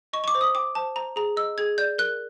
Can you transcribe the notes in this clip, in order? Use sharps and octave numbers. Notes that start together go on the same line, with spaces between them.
D#5 C#6
C#6
D6
C5
D#6
G5 D6
C5 A5
C5 A#5
G#4 A#5
D#5 E6
G#4 G#6
D5 G6
A#4 F#6